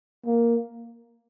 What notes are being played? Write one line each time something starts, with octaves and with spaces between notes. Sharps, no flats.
A#3